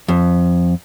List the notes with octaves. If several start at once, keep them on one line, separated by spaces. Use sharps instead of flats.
F2